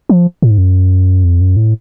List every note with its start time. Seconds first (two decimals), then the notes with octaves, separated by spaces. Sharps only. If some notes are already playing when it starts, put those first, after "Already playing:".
0.09 F3
0.42 A2
0.51 G#2
0.58 F#2
1.24 F2
1.41 F#2
1.57 A2